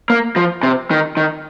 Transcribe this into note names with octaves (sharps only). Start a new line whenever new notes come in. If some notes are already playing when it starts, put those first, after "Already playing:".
A#3
F3
C3
D#3
D#3